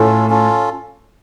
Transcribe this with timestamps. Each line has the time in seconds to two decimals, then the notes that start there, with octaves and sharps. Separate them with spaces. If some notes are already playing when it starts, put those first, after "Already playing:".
Already playing: A2 A3 C#4 F4 A4
0.29 C#4 F4 A4